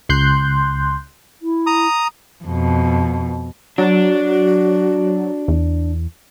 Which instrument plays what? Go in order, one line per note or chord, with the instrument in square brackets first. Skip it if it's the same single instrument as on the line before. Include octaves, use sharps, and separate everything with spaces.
[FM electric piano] C#2 C6 F#6 G6
[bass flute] E4
[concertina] A#5 D#6
[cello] F2 B2
[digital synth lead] F#3 [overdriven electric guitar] D4 [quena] F#4
[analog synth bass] E2